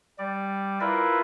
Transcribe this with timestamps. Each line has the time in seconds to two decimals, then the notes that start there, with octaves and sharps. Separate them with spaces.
0.18 G3 D5
0.81 E4 F4 A#4 B4 E5